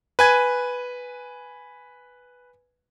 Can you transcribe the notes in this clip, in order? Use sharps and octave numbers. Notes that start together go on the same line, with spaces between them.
B4 G#5 G#6